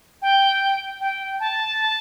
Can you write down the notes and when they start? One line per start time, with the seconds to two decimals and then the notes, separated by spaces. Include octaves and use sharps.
0.22 G5
1.01 G5
1.40 A5